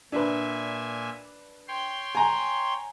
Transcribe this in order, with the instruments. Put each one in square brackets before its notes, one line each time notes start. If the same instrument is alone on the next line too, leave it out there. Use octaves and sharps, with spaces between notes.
[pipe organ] A#2 E5 G#5 [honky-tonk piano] D4 B4
[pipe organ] C#5 G5 C6
[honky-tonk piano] G#5 A#5